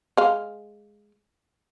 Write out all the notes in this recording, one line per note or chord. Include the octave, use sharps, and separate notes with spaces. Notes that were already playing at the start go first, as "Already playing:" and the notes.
G#3 F5